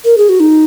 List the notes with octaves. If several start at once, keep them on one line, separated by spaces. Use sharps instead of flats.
A#4
G#4
F#4
D#4